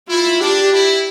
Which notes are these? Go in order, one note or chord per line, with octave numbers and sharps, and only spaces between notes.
E4 F4
D4 G4
E4